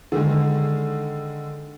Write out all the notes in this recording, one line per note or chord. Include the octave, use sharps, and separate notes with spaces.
D3 D#3 G#3